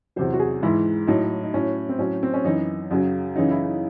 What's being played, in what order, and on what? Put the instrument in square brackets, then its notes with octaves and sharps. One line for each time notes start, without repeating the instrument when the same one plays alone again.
[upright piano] E2 C3 F#3 C5
F#4
G#4
G#2 E3 E4
A2 F#3 D#4
D#4
A2 F#3 C#4
C4
A2 F#3 C#4
C4
C#4
F#2 E3 D#4
F#2 C#3 F#3
F#2 C#3 E3 D#4
E4
D#4